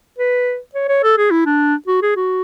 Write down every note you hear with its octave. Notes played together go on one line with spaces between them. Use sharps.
B4
C#5
C#5
A4
G#4
E4
D4
F#4
G#4
F#4